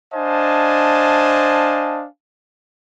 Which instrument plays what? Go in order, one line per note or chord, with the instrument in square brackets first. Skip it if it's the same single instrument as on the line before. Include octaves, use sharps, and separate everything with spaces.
[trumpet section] D4 C5 D#5 F5 G#5 A5